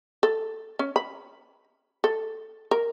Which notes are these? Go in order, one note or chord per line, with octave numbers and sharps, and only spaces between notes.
A4
C#4
B5
A4
A#4